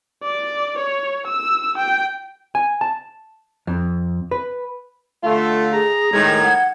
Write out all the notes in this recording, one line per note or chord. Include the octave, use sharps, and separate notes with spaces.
D5
C#5
E6
G5
G#5
A5
F2
B4
D3 A3 F4
G#4 A#5
A2 D#3 G#3 G#6
F#5